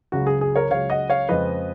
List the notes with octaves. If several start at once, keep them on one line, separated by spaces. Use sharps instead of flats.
C#2 C#3 F#3 F#4
G#4
G#4
A#4 C#5
C#2 C#3 F#3 C#5 F5
D#5 F#5
C#5 F5
F2 C#3 F3 G#3 B4 D#5